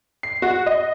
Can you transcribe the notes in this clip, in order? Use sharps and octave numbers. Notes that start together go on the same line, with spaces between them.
C7
F#4
D#5